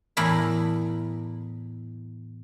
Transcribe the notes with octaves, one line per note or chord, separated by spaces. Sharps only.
E2 A2 E4 A#4 B5